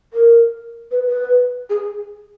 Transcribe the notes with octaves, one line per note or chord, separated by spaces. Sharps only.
A#4
B4
B4
G#4